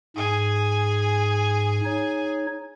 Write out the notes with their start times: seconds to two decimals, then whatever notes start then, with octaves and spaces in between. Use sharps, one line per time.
0.16 G#2 G#4 G#5
1.85 D#4 C#5